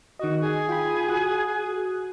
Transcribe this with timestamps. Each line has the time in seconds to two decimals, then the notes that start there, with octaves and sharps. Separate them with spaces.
0.19 D#3 F#4 D#5
0.41 G#4
0.69 F4 G5 B5
1.09 F#4 D#6 F#6